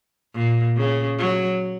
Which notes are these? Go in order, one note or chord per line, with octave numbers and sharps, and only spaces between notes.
A#2
C#3
F#3